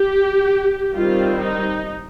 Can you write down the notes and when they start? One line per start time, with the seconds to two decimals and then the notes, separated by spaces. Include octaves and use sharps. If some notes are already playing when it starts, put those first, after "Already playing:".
Already playing: G4
0.95 D#3 G3 C4 F4
1.40 D#4